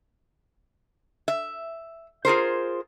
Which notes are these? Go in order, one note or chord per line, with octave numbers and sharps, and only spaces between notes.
E5
F4 G#4 A#4 C5